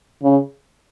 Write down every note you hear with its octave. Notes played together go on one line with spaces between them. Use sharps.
C#3